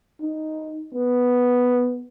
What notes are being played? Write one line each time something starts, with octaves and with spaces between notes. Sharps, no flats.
D#4
B3